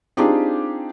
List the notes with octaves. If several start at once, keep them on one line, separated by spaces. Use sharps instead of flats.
C4 D4 D#4 F4 G4 G#4